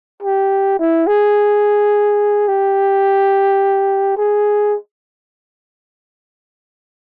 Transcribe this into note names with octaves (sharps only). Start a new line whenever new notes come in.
G4
E4
G#4
G4
G#4